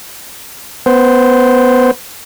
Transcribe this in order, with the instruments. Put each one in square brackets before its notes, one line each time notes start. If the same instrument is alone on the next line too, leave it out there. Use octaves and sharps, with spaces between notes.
[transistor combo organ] B3 C5